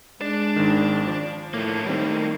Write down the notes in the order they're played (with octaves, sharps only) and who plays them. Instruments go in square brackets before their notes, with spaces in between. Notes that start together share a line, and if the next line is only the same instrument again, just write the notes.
[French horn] G#3 [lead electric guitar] D4 D5
[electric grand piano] G#1 D#3
F3
[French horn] A2 [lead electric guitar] A3 A#3
[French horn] D#3 [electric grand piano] G3 C4